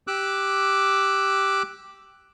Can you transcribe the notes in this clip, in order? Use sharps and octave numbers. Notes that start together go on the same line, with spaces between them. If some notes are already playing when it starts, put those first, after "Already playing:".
G4 D6 E6 F#6